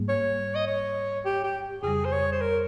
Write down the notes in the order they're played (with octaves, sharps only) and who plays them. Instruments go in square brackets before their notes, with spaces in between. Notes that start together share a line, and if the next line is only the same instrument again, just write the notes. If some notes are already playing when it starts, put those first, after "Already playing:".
Already playing: [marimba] G#2 G3 A#3
[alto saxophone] C#5
D#5
C#5
G4
G4
[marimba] F2 C#3 G3 [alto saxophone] G#4
[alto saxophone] C5
C#5
C5
A#4